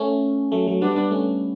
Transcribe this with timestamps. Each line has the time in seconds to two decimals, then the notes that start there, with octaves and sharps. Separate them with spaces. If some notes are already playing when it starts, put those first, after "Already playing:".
Already playing: A3 C#4
0.52 F#3 A3
0.67 F#3 A3
0.81 G3 B3 D4
0.96 G3 B3
1.11 A3 C#4